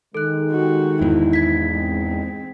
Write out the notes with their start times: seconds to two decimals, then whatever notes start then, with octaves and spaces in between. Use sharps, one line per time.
0.15 D#3 G#3 A4 F#6
0.52 F#4 G4
1.01 E2 G#2 E4
1.33 G#6 B6
1.74 G#3 C4